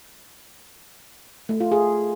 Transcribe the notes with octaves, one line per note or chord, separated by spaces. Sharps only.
A3
F4
G#4